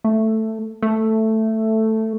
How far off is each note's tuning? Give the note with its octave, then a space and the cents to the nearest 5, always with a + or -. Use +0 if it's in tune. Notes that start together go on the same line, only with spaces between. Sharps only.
A3 +5
A3 +5